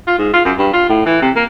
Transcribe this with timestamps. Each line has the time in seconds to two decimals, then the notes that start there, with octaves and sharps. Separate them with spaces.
0.07 F4
0.19 G#2
0.33 F4
0.45 F#2
0.58 G2
0.73 F4
0.89 A2
1.06 E3
1.22 C3
1.36 A#3